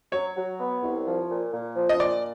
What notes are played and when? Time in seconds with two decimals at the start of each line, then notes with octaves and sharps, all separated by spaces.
0.12 F#3 C#5
0.36 F#3
0.59 B3
0.83 C2
1.06 F3
1.30 A#2
1.53 A#2
1.76 F3
1.89 D#5
2.00 A#2 D5